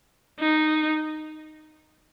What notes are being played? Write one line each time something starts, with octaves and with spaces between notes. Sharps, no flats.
D#4